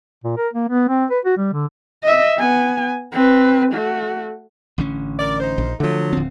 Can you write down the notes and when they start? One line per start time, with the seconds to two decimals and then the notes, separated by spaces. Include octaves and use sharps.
0.24 A#2
0.37 A#4
0.53 A#3
0.69 B3
0.89 C4
1.10 B4
1.25 F#4
1.37 G3
1.53 D3
2.03 D#5 E5
2.37 B3 G#5
3.12 C4 B4
3.72 A3 F#4
4.78 A1 D3 C#4
5.19 A#4 D5
5.40 D#4 C5
5.58 A#1
5.80 D3 F3 F#3 A3
6.13 D1 C4